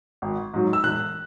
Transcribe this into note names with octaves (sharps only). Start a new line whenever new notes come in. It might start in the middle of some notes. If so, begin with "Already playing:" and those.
G#1
G#2 F#3
E6
E1 F#6